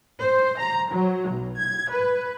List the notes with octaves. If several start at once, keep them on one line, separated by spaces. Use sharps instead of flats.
C5
A#5
F#3
B1
G#6
B4